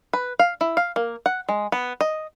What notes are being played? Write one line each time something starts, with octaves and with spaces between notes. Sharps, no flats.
B4
F5
E4
F5
A#3
F#5
G#3
B3
D#5